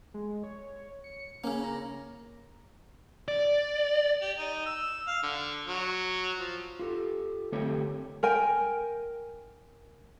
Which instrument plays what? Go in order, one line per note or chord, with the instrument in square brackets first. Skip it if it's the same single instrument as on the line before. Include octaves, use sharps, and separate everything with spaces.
[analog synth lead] G#3
C#5
C#7
[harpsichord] C#3 A#3 [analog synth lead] C#4
[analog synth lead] A#5
[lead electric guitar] D5
[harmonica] G4
D#4
E6
F5
D3
F#3
F3
[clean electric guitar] F4 G4 A4
D3 A3 C4 G4 A4 C#5
[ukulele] A#4 G5 G#5